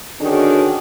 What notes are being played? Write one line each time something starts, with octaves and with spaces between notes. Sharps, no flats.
D3 D#3 C#4 D4 F#4 G#4